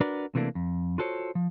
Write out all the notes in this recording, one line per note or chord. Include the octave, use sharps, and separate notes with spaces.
D4 F#4 A#4 B4 D5
C3 E3 A3 A#3 D4
F2
F4 F#4 A4 C5 C#5
F3